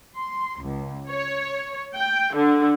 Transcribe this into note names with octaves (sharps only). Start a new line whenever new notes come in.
C6
C#2
C#5
G5
D3